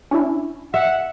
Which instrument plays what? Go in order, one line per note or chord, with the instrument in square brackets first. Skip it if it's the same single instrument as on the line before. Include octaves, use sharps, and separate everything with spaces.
[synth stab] C#4 D4 E4
[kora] E5 [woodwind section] F#5